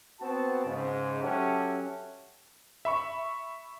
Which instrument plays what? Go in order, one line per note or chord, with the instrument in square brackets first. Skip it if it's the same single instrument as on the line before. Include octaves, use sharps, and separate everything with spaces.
[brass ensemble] B3 C4 F#4 A5
G#2 C#3
F#3 C#4 G4 A4 E5 F#5
[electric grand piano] E5 B5 C#6